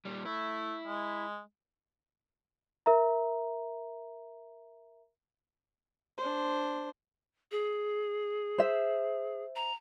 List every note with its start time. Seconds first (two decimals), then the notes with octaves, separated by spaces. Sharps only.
0.05 A#2 G3
0.25 A3 E4
0.87 G#3
2.86 A#4 E5 A#5
6.18 D4 C5
7.51 G#4
8.58 C5 E5
9.56 A#5